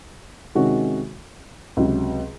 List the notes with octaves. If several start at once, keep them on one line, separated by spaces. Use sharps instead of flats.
C3 D#3 G#3 C#4 F#4
C#2 C3 F#3